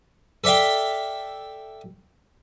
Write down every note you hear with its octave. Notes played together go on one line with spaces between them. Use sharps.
A4 D5 E5 F5 G5